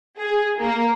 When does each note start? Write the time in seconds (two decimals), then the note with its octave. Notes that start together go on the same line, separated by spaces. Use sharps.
0.19 G#4
0.60 A#3